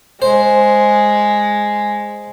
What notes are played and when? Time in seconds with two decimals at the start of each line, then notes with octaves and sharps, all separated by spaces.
0.22 G#3 C5